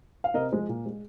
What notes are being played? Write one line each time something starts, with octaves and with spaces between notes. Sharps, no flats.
F5
C3 A#4 D#5
F3 G#3
A#2
G#3